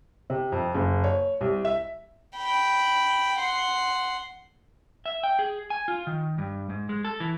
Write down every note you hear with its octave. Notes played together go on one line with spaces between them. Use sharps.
C3
F2
F#1
C#5
C2
E5
G5 B5
F#5 C6
E5
G5
G#4
G#5
F4
D#3
G2
G#2
G#3
A4
E3